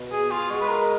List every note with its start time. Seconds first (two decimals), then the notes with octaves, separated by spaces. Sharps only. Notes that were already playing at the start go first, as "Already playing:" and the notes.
Already playing: B2
0.12 G#4
0.31 F4
0.50 G#3 F#4
0.61 B4
0.68 A#4